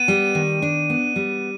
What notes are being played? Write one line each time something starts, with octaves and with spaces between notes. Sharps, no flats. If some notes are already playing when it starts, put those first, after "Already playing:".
Already playing: B3 D#7
G3
D#3
D4
B3
G3